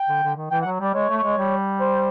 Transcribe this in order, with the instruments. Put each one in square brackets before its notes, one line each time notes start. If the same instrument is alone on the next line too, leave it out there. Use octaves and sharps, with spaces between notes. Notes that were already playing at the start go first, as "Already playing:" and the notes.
Already playing: [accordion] G5
[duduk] D3
D3
D#3
[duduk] E3 [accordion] G5
[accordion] F#5
[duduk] F#3
[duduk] G3 [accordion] D5
[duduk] G#3 [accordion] C#5
[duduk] A3
G#3
G3
[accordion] C5